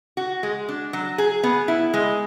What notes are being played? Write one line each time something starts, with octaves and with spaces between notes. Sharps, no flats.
F#4
G#3
D4
F#3
G#4
B3
E4
G#3